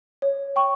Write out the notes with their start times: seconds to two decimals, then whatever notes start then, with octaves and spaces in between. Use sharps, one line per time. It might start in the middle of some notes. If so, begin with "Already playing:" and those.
0.22 C#5
0.56 G5 C#6